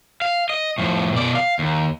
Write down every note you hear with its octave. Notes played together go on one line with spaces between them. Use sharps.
F5
D#5
A2 F3
B2 D5
F5
D#2